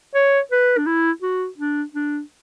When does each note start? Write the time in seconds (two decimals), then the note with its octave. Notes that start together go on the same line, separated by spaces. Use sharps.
0.15 C#5
0.52 B4
0.78 D4
0.86 E4
1.22 F#4
1.58 D4
1.95 D4